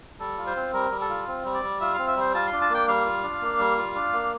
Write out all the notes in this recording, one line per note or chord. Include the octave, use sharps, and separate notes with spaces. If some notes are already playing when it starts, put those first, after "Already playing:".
G3 A4
F4
C5
C4
G3 A#4
G3
A4
F4
C4
G3
D5
G3
F4 E5
C4 F5
E5
G3 C5
F4 A5
C6
D4
A5
A#3 G5
G3 F5
F4
D4
A#3
G3
F4
D4
A#3